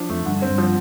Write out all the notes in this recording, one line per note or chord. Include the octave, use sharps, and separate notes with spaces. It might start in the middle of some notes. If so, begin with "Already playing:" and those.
Already playing: F3 D4
F2 A3
G2 D3
C4
G2
F3